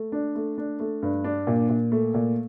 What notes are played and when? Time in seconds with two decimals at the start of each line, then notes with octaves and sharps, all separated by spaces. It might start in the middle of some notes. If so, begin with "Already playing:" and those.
Already playing: A3
0.12 D4
0.35 A3
0.58 D4
0.80 A3
1.02 G2
1.24 D4
1.47 A#2
1.69 A#2
1.92 A3
2.14 A#2